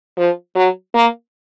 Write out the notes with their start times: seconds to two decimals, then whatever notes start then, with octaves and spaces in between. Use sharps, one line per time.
0.17 F3
0.55 F#3
0.94 A#3